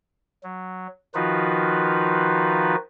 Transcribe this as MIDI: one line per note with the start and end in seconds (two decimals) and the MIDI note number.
0.43 0.87 54
1.15 2.76 51
1.15 2.76 53
1.15 2.76 63
1.15 2.76 65
1.15 2.76 66
1.15 2.76 71